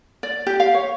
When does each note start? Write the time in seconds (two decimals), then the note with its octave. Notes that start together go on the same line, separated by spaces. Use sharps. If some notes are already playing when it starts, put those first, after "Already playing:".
0.23 D5
0.47 G4
0.60 F5
0.74 C#5